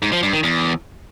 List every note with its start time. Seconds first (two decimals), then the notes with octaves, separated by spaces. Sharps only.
0.02 G#2
0.13 F3
0.23 G2
0.33 D#3
0.43 E2